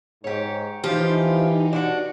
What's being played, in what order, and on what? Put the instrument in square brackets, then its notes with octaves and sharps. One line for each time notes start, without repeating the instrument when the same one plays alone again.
[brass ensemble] G#2 [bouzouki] G4 C#5
[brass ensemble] E3 [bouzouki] F3 F4 [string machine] D#4 [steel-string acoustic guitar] G4
[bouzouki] D4 E4 F#4